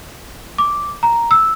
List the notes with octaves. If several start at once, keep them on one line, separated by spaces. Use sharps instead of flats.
D6
A#5
E6